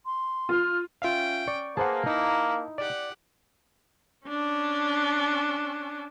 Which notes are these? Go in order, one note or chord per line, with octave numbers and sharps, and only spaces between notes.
C6
F4 F6
C#4 F4 E5 F5 G5
D5 C#6
A#3 G#4 B4 C5 F#5 A5
D#4 E4
G4 D5 F#5
C#4 D4